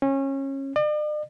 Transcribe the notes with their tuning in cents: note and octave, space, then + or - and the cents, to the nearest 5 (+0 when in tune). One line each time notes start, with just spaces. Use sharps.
C#4 -25
D5 +45